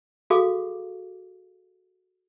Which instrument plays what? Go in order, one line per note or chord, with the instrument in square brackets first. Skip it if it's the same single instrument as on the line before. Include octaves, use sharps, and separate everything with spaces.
[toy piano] F#4 G#4 A4 F5 C#6 D6